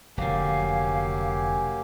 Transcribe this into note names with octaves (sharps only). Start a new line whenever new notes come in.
F1 D3 F#3 A#3 G4 F5 G#5